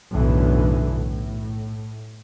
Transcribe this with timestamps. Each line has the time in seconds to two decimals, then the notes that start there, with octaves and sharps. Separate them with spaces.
0.12 B1 F#2 A2 D3 E3
0.92 A2